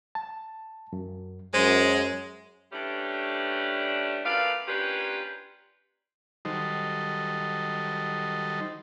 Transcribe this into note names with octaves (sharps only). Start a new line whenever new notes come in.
A5
F#2
F#2 G#3 C5
E3 G3 A3 C#4 D4
F#2 A3 B4 D5 F5
A#3 C#4 D4 F4 G4 B4
D#3 F#3 G3 D#4 A4 C5